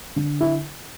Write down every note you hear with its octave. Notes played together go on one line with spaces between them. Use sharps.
D3
E4